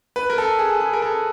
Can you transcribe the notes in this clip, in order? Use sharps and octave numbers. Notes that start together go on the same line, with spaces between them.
B4
A#4
A4
G#4
G#4
A#4
A4